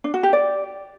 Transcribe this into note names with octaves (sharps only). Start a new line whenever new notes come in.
D4
F#4
G4
D5